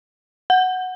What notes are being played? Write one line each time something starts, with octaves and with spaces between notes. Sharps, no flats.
F#5